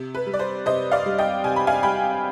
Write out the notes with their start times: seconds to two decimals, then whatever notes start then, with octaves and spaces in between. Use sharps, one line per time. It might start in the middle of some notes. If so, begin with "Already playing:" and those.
Already playing: C3
0.15 B4
0.26 G3
0.33 D5
0.39 C5
0.66 C3 C5 D#5
0.92 D5 F5
1.06 G3
1.18 D#5 G5
1.44 C3 G#5
1.56 B5
1.67 F5 G#5
1.83 G3 G5 B5